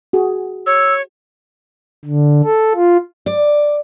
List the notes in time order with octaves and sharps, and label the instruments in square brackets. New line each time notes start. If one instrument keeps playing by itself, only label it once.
[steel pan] F#4 G#4
[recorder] C#5 [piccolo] E6
[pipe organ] D3
A4
F4
[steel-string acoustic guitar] D5